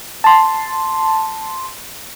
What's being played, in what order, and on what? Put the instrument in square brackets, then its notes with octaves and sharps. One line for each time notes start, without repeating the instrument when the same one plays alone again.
[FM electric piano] A5 C6